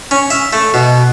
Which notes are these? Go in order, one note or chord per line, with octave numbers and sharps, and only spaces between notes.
C#4
E5
A3
B2